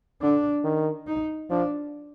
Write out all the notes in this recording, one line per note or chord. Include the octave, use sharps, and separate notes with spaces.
D3 D4
D#3
D#4
F3 D4